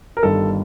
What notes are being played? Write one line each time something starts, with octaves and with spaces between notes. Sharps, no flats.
A#4
G1 G2 D#3 A4